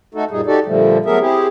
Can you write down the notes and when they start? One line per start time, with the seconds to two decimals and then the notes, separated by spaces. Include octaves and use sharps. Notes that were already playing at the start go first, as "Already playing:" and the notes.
0.14 A3 D#4 F#4 A4
0.31 F#2 A#2 G3 D#4 G#4
0.46 D#4 F#4 G4 A4 D5
0.66 A#2 D3 F3 G3 A3
1.06 F#3 A3 B3 G#4 A#4 E5
1.20 C4 E4 G4 G#4